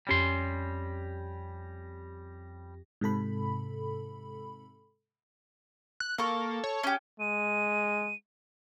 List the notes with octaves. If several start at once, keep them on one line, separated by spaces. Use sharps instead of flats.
F2 G3 C#4 G4 C6 A#6
G#2 C3 A4 B5
F#6
A#3 A4 C#6
C#5
C#4 G4
G#3 D#7